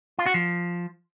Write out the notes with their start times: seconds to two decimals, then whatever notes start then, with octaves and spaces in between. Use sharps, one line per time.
0.19 F4
0.26 F#4
0.34 F3